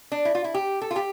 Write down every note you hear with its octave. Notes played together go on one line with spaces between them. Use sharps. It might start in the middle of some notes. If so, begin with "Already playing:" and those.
D4
E4
F4
E4
G4
A4
F4
G4